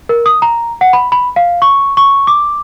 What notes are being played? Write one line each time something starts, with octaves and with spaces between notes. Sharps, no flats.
A#4
D#6
A#5
F#5
B5
B5
F5
C#6
C#6
D6